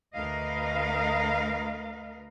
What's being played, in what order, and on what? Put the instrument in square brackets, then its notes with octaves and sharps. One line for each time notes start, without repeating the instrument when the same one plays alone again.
[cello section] D2 A3 A#4 B4 D#5 F5